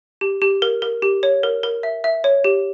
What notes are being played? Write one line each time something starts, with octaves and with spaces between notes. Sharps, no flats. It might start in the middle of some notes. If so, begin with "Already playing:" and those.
G4
G4
A#4
A#4
G4
C#5
A#4
A#4
E5
E5
C#5
G4